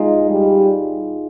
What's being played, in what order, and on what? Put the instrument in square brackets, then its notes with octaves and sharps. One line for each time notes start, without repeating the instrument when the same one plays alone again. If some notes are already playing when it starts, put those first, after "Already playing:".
Already playing: [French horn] G#3 [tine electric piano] D#4 F4 G#4
[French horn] G3